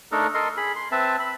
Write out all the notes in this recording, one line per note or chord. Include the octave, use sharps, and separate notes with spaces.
A3 D4 D#4 A4 A#4
A4 A#4 D#5 C6
G#4 B5
C6
C4 B4 E5 A5
B5